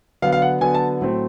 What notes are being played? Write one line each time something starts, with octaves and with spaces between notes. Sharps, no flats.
D3 F#3 B3 F5
F5
F#5
D3 F#3 B3 G#5
A5
A2 F#3 A3 C4